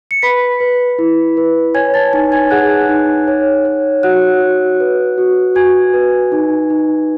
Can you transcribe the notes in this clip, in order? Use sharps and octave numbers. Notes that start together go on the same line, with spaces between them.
C#7
B4 B5 B6
B4
E4
B4
C#5 G#5 G#6
A5 A6
D#4 G#5 G#6
G#5 G#6
G#4 F#5 F#6
D#4
C#5
C#5
F#4 F#5 F#6
F#4
B4
F#4
F#4 G#5 G#6
B4
D#4
D#4